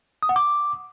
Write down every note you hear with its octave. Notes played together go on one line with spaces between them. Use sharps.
D#6
F#5
D6